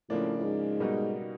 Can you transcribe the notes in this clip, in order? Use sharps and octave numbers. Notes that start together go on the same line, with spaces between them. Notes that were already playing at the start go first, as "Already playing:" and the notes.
A2 C#3 F3 A#3 D4
A2
G#2
B2 G3 A#3 D#4 F#4